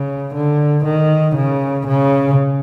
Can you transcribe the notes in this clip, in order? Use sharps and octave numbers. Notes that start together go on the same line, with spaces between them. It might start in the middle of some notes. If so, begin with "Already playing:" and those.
Already playing: C#3
D3
D#3
C#3
C#3